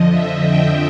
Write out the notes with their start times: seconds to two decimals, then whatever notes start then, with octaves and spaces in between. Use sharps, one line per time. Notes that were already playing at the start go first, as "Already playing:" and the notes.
Already playing: F2 D3 F3 D#5
0.11 E5
0.47 G5